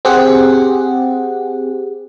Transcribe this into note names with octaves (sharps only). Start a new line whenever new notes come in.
C4 G4 G#4 F#5